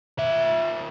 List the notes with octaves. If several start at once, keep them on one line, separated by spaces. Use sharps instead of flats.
D#3 E5